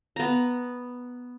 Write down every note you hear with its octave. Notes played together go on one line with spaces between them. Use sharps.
B3 A#5